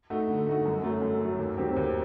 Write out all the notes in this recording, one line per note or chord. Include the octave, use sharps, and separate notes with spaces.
A3 D#4 F#4
D3
A3 D#4 F#4
F#2
F#3 A3
F#2
F#3 A3
D#2
D#3 F#3 C4 G4
D#2